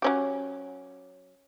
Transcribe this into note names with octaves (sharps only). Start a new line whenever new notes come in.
F#3 C#4 G4